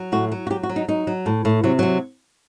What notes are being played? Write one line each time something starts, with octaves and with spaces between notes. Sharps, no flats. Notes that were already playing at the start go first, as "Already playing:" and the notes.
Already playing: F#3
A2 F#4
F#3
F#4
F#3 G4
F#4
F#3
D#4
F#3 D#4
F#3
A2
A2
C3 F#3
C3 F#3